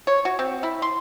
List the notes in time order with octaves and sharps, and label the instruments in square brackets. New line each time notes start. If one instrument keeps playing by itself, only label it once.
[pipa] C#5
F#4
C4
E4
C6